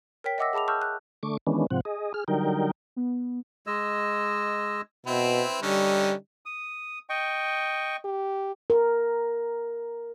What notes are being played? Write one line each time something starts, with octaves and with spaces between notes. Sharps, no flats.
A#4 C#5 G5 B6
D#5 E5 F#5 D6 E6 A#6
G#4 A5 B5 D6 F7
A5 C#6 E6 F6 G6
F#6
D3 A3 C#6 D6
D#3 E3 G#3 B3 C#4 D4
G#2 C3 F3 C4 F#5
G#4 D#5
G#4 F6
D3 F#3 G3 D#4 A#4 G5
B3
G#3 D#5 E6
B2 C4 E4 B4
D3 G3 C#4 D#4
D#6
D#5 G5 C#6
G4
A#4